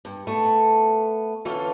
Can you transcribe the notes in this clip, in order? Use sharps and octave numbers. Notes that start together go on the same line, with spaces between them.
G2
A3 B3
D3 E3 C#4 F4 A4